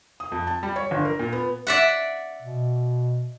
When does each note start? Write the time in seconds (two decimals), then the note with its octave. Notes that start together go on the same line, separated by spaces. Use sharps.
0.20 D#6
0.32 F2
0.47 A5
0.63 G3
0.76 C#5
0.91 G1
1.05 A#4
1.19 A#2
1.33 B3
1.67 D5 E5 F#5
2.42 B2